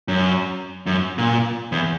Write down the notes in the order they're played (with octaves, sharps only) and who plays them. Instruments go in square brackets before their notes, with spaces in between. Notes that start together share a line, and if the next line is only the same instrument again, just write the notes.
[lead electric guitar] F#2
F#2
A#2
E2